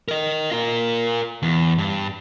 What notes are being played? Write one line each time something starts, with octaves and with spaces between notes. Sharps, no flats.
A#4 D#5
F4 A#4
E2
G2